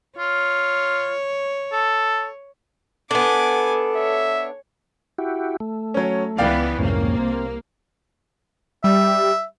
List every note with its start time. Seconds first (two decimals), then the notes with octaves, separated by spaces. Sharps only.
0.19 F4 C#5
1.73 A4
3.11 B3 D4 A4 G#5 D6
3.96 C#5 E5
5.18 E4 F#4 G4
5.60 A3
5.94 F#3 C#4
6.38 C#2 E3 B3 D5 F5 G5
6.79 C2 F2 G#2 A#3 C#4
7.19 C4
8.84 G3 E5